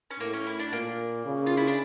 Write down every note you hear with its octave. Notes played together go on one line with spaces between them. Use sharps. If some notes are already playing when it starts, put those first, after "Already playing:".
C#4
A2 A#3
C#4
E4
D4
A#2 A#3
C#3
F4
E4
D4